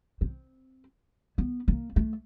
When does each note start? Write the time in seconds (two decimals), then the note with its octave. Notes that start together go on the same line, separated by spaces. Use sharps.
0.21 C4
1.38 B3
1.68 A#3
1.96 A3